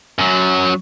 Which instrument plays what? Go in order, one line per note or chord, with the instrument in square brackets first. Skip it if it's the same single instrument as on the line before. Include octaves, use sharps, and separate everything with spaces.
[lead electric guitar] F#2 F#3